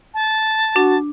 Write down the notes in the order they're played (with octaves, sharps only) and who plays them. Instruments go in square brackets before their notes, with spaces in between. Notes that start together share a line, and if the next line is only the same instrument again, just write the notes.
[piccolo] A5
[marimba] D4 [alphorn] F#4